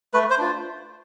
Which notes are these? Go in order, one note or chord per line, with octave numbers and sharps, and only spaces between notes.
A3 B4
C5
D4 F4